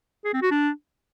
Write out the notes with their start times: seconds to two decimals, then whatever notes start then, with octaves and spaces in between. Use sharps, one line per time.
0.25 G#4
0.33 C4
0.42 F#4
0.51 D4